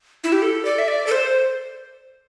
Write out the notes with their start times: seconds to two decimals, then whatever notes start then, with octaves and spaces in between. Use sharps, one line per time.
0.24 E4
0.32 G4
0.42 A4
0.65 D5
0.79 E5
0.88 D5
1.07 A4
1.12 C5